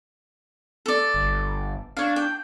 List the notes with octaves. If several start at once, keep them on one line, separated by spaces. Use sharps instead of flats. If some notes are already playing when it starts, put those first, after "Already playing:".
A4 D5
G1
D4 C#5 F5
G5